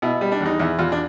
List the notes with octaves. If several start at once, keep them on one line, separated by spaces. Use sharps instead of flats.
B2 E4
G3
D4
E2
D#4
E2 E4
E2 F4
D4